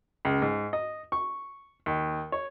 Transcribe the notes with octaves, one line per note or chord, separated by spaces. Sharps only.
C#2
G#2
D#5
C#6
D#2
C#5